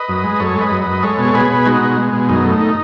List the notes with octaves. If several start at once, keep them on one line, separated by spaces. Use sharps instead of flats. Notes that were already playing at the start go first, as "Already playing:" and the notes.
Already playing: B4 D#5
F#2
G#3
F#2 A4 C#5
G#3
B4 D#5
F#2
F#2 B4 D#5
G#3 A4 C#5
B2
A4
B2 G#4 B4
B2
G#3 D#4 F#4
B2
G#3
B2
F#2 D#4
A3
D#3